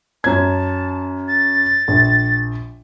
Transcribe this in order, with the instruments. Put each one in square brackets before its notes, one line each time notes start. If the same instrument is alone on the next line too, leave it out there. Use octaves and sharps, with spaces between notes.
[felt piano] F#2 G#6 [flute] A5
[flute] A6
[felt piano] A#1